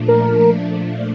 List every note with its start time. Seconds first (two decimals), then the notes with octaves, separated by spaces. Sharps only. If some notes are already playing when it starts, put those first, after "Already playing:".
Already playing: A#2 F3 A3 D4
0.08 A#4